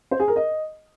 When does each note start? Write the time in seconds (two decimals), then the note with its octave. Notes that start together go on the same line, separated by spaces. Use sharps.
0.11 C5
0.20 G#4
0.28 A#4
0.36 D#5